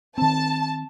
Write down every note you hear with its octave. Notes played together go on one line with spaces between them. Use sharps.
D#3 C4 A5